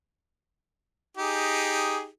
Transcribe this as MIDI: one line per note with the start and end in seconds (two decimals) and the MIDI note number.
1.17 2.07 63
1.17 2.07 67
1.17 2.07 68